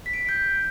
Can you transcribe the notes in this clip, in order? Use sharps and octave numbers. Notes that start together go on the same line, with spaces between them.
B6
D7
B6
G6